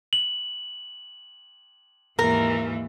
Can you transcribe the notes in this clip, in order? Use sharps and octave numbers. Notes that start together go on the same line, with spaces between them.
F#7
D#2 G#2 E3 A#4